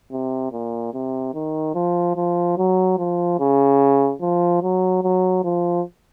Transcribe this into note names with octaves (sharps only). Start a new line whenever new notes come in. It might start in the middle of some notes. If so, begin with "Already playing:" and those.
C3
A#2
C3
D#3
F3
F3
F#3
F3
C#3
F3
F#3
F#3
F3